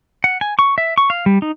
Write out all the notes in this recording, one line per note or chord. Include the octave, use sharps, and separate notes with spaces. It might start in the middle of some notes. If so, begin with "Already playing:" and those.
F#5
G#5
C#6
E5
C#6
F5
G3
D#4